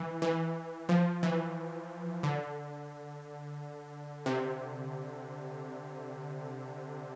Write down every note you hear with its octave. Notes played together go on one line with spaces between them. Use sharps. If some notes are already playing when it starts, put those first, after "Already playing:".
Already playing: E3
E3
F3
E3
D3
C3